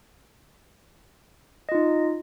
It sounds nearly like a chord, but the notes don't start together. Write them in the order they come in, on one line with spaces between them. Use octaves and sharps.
D#5 F4 D#4